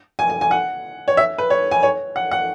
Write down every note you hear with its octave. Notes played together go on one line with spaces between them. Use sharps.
G#5
G#5
G#5
F#5
C#5
E5
B4
C#5
G#5
C#5
F#5
F#5